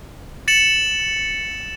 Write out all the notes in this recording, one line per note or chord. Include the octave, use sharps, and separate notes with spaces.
A6 C#7 E7 F#7